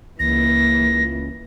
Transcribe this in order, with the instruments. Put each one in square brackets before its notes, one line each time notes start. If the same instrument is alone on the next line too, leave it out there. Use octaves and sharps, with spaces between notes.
[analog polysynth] C#2 [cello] E3 A#3 [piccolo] A#6